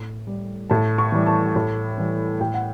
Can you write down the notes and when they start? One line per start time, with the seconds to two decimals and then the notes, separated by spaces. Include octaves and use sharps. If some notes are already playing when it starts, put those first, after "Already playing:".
Already playing: A2
0.27 G3
0.70 A2 A5
0.98 C#6
1.12 E3 G3
1.26 A5
1.56 A2
1.97 E3 G3
2.40 A2 G5
2.54 F#5